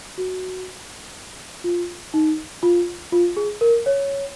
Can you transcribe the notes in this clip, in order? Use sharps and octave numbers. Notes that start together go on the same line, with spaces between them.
F#4
F4
D#4
F4
F4
G#4
A#4
C#5